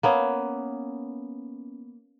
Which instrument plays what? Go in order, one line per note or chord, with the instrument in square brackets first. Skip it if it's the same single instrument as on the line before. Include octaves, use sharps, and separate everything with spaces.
[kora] A#3 B3 C#4